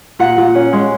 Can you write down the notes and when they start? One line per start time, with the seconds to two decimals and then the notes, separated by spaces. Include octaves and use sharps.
0.19 A#2 F#5
0.38 A#2
0.55 C#4
0.73 G#3